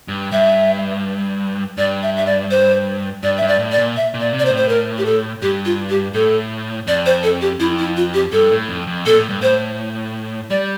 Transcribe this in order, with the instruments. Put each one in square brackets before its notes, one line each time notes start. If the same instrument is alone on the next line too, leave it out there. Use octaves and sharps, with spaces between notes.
[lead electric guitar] G2
[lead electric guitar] G2 [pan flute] E5
[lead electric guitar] G2 [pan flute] D5
[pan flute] E5
E5
D5
C5
[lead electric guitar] G2 [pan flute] D5
[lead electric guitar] G2 [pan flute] E5
[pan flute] D5
[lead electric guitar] A2
[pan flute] D5
[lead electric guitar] A#2
[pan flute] E5
[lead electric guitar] A#2
[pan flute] D5
[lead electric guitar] C3
[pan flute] D5
C5
[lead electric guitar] A2
[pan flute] C5
A#4
G4
A4
[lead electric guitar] G2 [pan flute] G4
[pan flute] F4
G4
[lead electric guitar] A2 [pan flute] A4
[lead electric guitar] F2 [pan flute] D5
[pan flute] C5
A4
G4
[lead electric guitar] F2 [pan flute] E4
[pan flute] E4
F4
G4
[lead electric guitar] G2 [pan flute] A4
[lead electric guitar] A2
F2
F2
[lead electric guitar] A#2 [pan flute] A4
[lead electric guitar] A2
G2
[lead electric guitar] A2 [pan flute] C5
[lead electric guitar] G3 [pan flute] D5